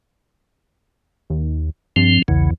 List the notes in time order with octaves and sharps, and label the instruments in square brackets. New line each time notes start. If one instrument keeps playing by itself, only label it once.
[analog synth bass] D#2
[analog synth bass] G2 [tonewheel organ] F3 C4
[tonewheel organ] B1 C#3 [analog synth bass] E2